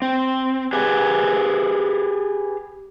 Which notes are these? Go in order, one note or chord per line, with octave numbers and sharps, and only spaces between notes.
C4
G4 G#4 B4